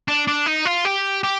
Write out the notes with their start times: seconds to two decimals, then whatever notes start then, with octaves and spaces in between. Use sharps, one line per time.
0.08 D4
0.28 D4
0.46 D#4
0.65 F4
0.85 G4
1.23 G4